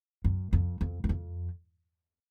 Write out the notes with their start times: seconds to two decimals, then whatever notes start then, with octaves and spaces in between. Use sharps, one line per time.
0.24 F#2
0.53 F2
0.81 F2
1.04 F#2
1.09 F2